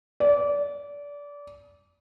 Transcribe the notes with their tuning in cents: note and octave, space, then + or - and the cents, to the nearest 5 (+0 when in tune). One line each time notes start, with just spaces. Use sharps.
D5 -25